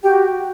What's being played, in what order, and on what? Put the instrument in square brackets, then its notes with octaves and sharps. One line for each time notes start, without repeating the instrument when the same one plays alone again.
[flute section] F#4 G4 G5